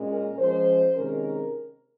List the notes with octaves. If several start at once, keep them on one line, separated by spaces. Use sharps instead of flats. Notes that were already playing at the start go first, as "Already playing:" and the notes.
Already playing: A#2 G#3 C#4
A#4
F3 G#3 C#4 C5
C3 D#3 G#3 C#4 A#4